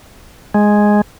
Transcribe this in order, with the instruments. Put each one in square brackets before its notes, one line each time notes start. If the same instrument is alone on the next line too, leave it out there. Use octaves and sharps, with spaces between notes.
[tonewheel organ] G#3